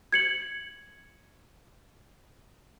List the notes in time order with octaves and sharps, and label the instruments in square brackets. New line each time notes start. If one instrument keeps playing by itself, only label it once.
[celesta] G#6 C#7 F#7